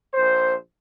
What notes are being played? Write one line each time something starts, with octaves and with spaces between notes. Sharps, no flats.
A#1 C5